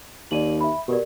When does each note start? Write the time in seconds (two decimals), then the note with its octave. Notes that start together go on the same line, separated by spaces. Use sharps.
0.31 D#2 D5 D#7 F#7
0.61 E5 B5
0.88 B2 G4 A#4 D5